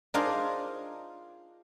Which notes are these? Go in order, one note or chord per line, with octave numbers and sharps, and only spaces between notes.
D4 D#4 F4 G#4 A#4 C5